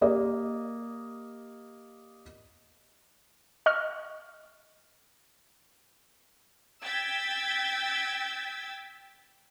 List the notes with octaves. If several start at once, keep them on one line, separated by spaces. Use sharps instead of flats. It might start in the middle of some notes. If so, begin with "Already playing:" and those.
A#3 G4 D5 D#5
D#5 C#6 F6
G5 E6 G#6 A6 B6